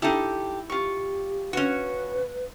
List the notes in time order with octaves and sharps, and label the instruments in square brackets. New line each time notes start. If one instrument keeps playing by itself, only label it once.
[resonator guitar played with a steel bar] D#4 E4 [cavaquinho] G4 A4
[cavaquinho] F4 C#6 [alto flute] G4
[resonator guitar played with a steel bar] C#4 F#4 [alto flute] B4